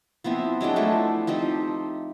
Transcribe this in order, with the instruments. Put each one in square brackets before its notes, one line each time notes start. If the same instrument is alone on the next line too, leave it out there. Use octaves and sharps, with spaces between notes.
[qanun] F3 B3 C4 E4
F#3 G#3 D4 G5
F3 A3 E4
F3 C4 D#4 G4